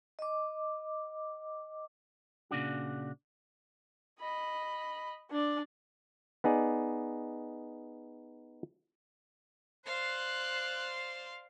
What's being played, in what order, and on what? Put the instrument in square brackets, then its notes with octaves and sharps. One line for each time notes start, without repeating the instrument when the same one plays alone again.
[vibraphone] D#5 D6
[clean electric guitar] A#2 C#3 D4 F#4
[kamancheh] D#5 B5
D4 D5
[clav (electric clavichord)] B3 D#4 G#4 D5
[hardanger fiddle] C5 D5 [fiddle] F5 C6 [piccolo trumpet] F#6